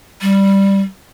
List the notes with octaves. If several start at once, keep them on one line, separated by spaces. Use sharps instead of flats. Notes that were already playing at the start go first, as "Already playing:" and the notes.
G3